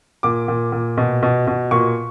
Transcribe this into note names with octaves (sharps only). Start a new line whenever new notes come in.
A#2 D6
A#2
A#2
B2
B2
B2
A#2 C#6